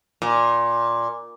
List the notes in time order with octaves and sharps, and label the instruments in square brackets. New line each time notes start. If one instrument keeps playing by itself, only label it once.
[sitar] A#2